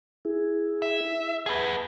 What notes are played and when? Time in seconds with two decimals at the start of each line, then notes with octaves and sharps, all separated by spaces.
0.25 E4 G#4
0.82 E5
1.46 G#4 B4 F#5 A5